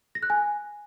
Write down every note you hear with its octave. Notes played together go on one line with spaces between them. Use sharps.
A#6
F#6
G#5